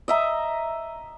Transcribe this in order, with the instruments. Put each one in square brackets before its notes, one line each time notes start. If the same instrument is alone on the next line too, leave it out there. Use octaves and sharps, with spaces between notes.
[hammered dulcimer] D#5 E5 A#5